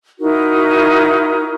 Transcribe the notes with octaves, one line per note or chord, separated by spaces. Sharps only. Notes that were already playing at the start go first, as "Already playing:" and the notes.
D#4 E4 F#4 A#4